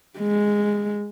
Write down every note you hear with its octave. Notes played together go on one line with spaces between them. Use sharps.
G#3